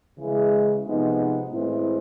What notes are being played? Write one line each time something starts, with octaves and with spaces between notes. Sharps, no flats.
C#3 E3 G#3
C3 F3 G#3 B3 D#4
A2 E3 G#3 C4 E4